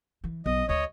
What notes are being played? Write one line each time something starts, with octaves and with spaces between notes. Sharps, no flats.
E3
B1 D#5
D2 A3 C#5 D#5